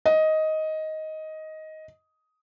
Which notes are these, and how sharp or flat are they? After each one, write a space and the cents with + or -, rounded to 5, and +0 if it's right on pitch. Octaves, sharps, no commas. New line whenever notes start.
D#5 +10